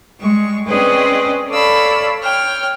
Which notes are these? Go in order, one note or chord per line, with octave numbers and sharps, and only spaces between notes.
G3 G#3 C#6
C4 C#4 G#4 B4 D5 D#5
A4 C#5 D5 F5 B5 E6
C#5 G5 F6